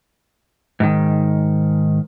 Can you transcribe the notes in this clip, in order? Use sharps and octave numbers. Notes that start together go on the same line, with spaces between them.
G#2 D#3